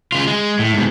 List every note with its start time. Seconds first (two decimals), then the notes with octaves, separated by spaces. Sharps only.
0.12 C#3 F4
0.27 G#3
0.59 A2
0.74 G#2 B2